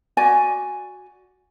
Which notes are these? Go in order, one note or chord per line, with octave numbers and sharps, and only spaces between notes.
F#4 D5 G#5